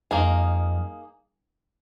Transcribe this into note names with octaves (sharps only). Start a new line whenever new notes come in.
F2 A#3 D#4 G#4